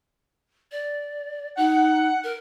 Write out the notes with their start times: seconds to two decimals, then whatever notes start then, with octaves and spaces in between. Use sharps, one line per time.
0.72 D5
1.57 D#4 F#5
2.24 A#4